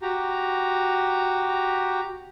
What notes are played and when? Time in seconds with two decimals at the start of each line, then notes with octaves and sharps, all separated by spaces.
0.02 F#4 G4 A#5